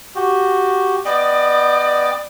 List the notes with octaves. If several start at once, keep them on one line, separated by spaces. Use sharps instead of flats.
F#4 G4
B3 D5 D#5 G5